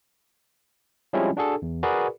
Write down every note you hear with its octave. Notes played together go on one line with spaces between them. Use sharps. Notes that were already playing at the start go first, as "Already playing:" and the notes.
F3 G3 G#3 C4 C#4 E4
D4 F#4 G#4 A4
E2
F#4 G#4 A#4 B4 D5